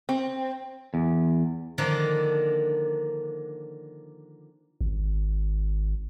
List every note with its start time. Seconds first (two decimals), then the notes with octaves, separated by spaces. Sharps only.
0.09 C4
0.94 E2
1.78 D3 D#3 F3 A#3 D4
4.81 G#1